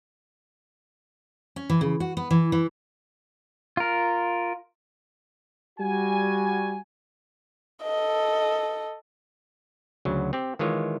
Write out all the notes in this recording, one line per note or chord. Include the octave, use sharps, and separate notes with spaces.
C#4
E3
C#3
F#4
B3
E3
E3
F4 A#4
G3 F#4 G#5
A4 D#5
D2 C#3 F#3
C4 G4
D#3 E3 G#3 F4 C#5